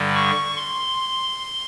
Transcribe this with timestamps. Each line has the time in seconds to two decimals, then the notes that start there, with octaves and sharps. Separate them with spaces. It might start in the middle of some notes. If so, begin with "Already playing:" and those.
Already playing: G2 D3 G3
0.15 C#6
0.56 C6